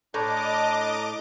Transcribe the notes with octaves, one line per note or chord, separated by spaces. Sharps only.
A2 D4 D#5 A#5 D6